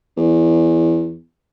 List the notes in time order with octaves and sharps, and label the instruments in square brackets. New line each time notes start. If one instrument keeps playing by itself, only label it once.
[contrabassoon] E2